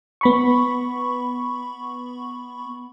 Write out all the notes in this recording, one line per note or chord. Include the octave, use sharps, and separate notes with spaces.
B3 B5 C#6